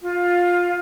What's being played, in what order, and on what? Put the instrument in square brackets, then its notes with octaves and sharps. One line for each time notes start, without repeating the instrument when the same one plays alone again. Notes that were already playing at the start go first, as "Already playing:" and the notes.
[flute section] F4